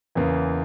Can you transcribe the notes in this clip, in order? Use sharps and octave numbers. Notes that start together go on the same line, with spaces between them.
E2 C#3 E3 A#3